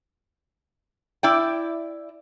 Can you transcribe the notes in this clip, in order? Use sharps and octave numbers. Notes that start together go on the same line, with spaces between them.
E4 D5 G5